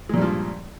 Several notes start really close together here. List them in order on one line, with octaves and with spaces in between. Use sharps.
G#3 A#2 G2 F3